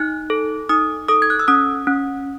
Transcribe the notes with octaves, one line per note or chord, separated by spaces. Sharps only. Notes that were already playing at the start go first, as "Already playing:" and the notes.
Already playing: D#4 F#6
A4
D#4 D#6
A4 D#6
G#6
F#6
E6
C#4 D#6
C#4